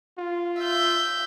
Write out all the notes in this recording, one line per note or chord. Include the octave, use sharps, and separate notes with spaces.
F4
E5 G6